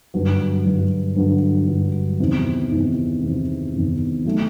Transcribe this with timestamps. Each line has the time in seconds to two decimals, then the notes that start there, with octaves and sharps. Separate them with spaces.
0.14 G2 D3 F#3
0.65 G2 D3 F#3
1.16 G2 D3 F#3
1.68 G2 D3 F#3
2.20 E2 C3 D#3
2.72 E2 C3 D#3
3.22 E2 C3 D#3
3.74 E2 C3 D#3
4.25 D#3 F#3 A3